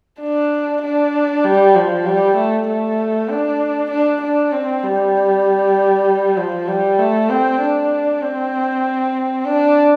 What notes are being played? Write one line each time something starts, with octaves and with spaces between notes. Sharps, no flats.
D4
D4
G3
F3
G3
A3
A3
D4
D4
D4
C4
G3
F3
G3
A3
C4
D4
C4
D4